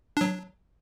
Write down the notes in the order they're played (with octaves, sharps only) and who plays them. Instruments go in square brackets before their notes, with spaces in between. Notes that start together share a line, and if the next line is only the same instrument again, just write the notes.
[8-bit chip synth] F#3 D4